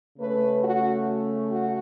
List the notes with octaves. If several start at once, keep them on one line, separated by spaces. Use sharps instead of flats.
C#3 A3 C#4 B4
F#4
F#4